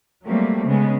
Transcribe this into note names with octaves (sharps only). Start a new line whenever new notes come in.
F#3 G3 A3 A#3 C4
C#3 G#3 B3